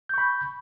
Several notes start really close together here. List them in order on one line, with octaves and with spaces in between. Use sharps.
G6 C#6 B5